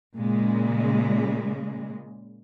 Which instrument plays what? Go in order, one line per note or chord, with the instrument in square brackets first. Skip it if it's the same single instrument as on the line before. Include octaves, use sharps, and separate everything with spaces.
[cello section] A#2 C#3 G#3